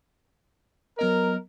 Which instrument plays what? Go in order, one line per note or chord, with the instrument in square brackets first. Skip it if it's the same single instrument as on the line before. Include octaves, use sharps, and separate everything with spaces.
[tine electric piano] F#3 B3 D#5 [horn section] A#4